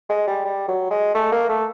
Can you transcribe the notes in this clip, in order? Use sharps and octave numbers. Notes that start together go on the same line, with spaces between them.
G#3
G3
G3
F#3
G#3
A3
A#3
A3